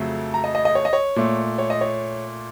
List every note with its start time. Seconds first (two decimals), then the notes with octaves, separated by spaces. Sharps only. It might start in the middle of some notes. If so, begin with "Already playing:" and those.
Already playing: F2 C#3 F#3 A3
0.34 A#5
0.44 D#5
0.55 D#5
0.65 D#5
0.75 C#5
0.85 D#5
0.93 C#5
1.16 A#2 A3
1.58 C#5
1.70 D#5
1.81 C#5